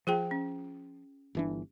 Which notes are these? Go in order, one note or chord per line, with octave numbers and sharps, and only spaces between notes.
F3 F4 G#4 G5
C#4
G1 E3 D4